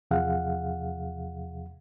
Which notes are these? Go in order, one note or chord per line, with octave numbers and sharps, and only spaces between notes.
E2 C3 F3 G#4 F5 F#5